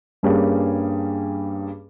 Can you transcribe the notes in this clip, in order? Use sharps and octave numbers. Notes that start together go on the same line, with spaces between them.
G2 G3 A#3 C#4 G#4